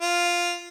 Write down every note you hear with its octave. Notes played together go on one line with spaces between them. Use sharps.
F4